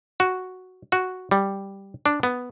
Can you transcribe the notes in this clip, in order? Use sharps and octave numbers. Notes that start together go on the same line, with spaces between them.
F#4
F#4
G3
D4
B3